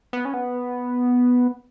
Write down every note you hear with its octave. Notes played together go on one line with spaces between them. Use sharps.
B3
C#4
B3